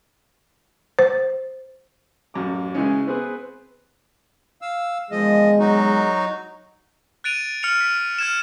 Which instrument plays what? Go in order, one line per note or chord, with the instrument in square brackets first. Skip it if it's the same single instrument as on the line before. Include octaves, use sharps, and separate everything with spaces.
[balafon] C5
[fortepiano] A1 F#2 D6
C#3 E3 G#3 C#4
B3 C4 G#4 B4
[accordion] F5 E6
[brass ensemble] E2 D#3 G#3 [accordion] F3 D#5
[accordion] F#3 D#4 F#4
[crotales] F#6 A6 D7 D#7 F7
F6 C#7 F7
B6
D#7
F6 G#6 E7